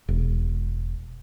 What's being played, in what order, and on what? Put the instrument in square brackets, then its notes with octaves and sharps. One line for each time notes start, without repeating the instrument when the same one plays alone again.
[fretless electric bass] E1